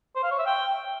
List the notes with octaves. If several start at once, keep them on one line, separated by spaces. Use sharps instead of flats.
C5
F5
C#5
E5
G5